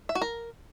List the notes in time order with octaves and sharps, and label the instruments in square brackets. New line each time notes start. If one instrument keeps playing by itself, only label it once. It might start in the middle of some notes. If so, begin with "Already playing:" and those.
[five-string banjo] E5
F#4
A#4